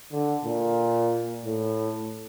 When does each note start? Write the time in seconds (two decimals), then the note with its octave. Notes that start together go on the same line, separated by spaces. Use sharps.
0.11 D3
0.45 A#2
1.45 A2